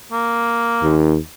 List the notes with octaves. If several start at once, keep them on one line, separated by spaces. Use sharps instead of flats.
A#3
D#2